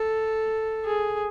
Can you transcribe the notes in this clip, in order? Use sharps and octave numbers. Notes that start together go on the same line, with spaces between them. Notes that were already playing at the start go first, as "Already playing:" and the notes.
Already playing: A4
G#4